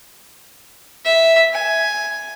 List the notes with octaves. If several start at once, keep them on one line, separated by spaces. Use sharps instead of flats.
E5
G#5